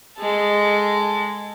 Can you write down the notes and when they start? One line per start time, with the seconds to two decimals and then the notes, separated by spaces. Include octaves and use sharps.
0.19 G#3 A4